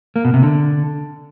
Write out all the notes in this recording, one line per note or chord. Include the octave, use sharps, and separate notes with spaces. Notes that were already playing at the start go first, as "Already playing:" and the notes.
A#3
B2
C3
D3